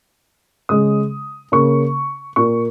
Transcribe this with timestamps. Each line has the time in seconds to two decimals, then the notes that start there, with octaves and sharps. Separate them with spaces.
0.69 C#3 G#3 D#6
1.52 C#3 A#3 C#6
2.36 A#2 A#3 C#6